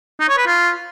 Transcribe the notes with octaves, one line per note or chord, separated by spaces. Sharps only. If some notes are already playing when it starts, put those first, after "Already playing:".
D#4
C#5
B4
F4